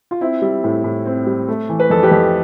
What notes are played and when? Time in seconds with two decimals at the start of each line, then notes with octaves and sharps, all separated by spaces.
0.11 F4
0.21 C4 E4
0.42 G3
0.64 A2
0.84 A2
1.06 C4
1.27 G3
1.48 A3
1.69 E3
1.79 B4
1.90 F2 A4
2.03 G4 B4
2.11 F2